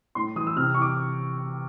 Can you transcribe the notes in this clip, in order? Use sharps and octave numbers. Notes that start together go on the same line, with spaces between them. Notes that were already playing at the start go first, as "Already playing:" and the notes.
A2 C6
E3 D#6
E6
C3 F6
C#6
E3 D6